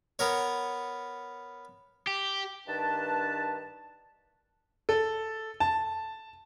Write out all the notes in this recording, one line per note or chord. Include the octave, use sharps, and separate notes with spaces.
B3 A#4 C#5
G4
G2 D#3 D4 B4 A5
A4
A5